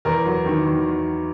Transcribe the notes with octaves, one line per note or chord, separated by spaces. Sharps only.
E2 A#4
F#3
D#3
E2